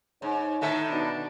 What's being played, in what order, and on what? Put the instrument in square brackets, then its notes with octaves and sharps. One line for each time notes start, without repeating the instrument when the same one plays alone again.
[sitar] G#2 [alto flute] D#4 [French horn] C#5
[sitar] A2 D#3 A4 [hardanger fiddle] E5
[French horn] B2 [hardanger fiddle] D4